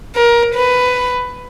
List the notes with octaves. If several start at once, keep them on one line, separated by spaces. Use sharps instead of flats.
A#4
B4